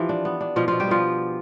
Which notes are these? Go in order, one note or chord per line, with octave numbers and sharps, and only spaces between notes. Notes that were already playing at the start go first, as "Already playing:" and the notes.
Already playing: E3 F3 F4 G4
D4
B3
D4
B2 F3 F4
B2 F3 F4
G3 G4
F3 B3 F4